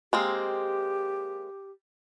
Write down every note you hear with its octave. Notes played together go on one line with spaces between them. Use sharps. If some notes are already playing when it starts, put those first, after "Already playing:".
G#3 A#3 C4 G4